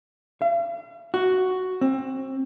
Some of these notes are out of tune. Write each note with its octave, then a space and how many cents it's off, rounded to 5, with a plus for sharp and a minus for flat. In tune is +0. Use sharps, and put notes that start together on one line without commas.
F5 -45
F#4 +5
C4 +25